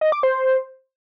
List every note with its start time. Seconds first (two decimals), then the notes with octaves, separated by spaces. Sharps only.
0.01 D#5
0.12 D6
0.23 C5